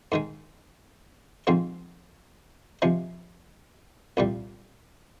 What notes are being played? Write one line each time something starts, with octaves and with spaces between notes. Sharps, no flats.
G#2 D#3 G#3
G#2 F3 G#3 C4
C3 F3 G#3
C2 A#2 G3